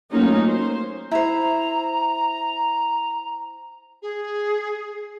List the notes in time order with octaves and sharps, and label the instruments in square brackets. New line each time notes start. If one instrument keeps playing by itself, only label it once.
[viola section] F#3 A3 A#3 C#4 D#4 F4
C5
[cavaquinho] E4 C5 [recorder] A#5
[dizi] G#4